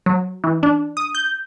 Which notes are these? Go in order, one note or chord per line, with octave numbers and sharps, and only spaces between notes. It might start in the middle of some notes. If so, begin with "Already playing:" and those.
F#3
E3
D4
D#6
G6